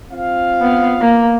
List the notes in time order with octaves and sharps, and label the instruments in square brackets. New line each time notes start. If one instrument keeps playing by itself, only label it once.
[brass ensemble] C4 F4 F5
[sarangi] B3
A#3